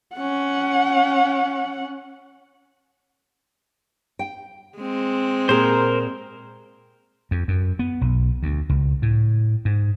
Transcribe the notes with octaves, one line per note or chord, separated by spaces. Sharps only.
C#4 F#5
G5
G#3 C4
A#2 G#4 A#4 C5
F2
F#2
B3
B1
D2
C#2
A2
G#2